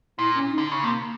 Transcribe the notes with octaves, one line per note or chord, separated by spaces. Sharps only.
A#2 E4
C#4
D#4
D3
C#3
C3 A#3